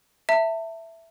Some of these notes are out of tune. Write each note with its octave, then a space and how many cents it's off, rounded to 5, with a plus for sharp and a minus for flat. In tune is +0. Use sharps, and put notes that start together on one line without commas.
E5 +0 A5 +40